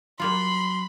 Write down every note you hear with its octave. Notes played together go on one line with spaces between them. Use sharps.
F#3 G3 A#3 F4 B5 C6